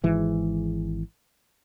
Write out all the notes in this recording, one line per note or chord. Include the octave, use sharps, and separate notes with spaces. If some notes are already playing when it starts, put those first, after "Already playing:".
G#1 G#2 E3 G#3